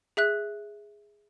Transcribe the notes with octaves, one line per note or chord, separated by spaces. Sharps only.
G#4 E5 F#6